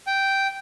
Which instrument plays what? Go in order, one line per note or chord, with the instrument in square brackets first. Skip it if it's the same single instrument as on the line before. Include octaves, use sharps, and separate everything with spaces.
[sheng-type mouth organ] G5